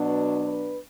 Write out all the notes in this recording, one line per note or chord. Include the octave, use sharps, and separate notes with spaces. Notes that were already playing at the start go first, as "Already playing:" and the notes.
Already playing: B2 F#3 B3 D4
B4
B4